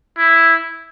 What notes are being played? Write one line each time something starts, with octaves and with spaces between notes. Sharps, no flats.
E4